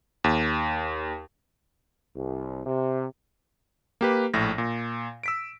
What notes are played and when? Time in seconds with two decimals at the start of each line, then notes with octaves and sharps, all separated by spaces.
0.24 D#2
2.16 C2
2.66 C3
4.01 A#3 G4 B4
4.34 A#1 A2 A#6
4.58 A#2
5.23 E6 B6 D7